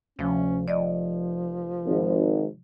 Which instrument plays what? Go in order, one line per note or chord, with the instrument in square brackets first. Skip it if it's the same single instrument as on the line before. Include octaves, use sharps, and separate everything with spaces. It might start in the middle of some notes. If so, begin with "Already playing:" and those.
[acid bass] D2 [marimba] C3 F3 [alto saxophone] C#4
[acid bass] F1 [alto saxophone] F3 [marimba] D5 D#5
[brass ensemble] G#1